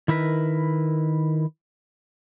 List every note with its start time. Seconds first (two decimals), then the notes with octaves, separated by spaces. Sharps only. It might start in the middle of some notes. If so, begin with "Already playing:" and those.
0.08 D#3 E4 A#4 B4